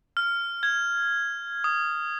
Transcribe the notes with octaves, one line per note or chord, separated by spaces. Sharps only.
F6
G#6
D#6